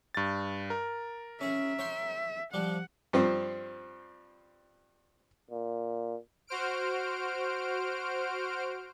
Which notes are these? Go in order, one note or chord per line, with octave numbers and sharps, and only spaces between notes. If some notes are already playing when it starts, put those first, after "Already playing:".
G2 A6
A#4
C#4 G#4 E5
C#5 G5 C6
F3 G3 F#5
G2 F3 C4
A#2
F#4 C5 F6 D7